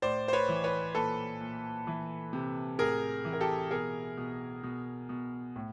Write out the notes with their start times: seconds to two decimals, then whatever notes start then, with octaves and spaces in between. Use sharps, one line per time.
0.02 A2 C5 D5
0.28 C5
0.33 B4 C#5
0.48 E3
0.63 B4 C#5
0.95 A#2 A4 B4
1.41 A#2
1.87 E3
2.33 C3
2.79 A2 G#4 A#4
3.25 E3
3.33 A#4
3.41 G4 A4
3.71 B2 G#4 A#4
4.17 B2
4.63 B2
5.09 B2
5.56 A2